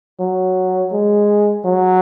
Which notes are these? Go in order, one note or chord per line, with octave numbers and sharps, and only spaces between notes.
F#3
G#3
F#3